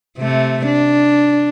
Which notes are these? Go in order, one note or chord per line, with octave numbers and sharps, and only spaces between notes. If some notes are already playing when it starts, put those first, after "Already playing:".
C3 A3
D4